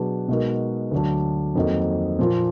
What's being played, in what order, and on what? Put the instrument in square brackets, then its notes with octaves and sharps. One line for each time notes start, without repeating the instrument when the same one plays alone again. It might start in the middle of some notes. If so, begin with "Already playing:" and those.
Already playing: [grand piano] B2 F#3 D4 G#4 B4
B2 G#3 D#4 F#4 A#4
D2 D3 F#3 D4
F2 D#3 F#3 A#3 D#4
A#2 F3 A#3 F4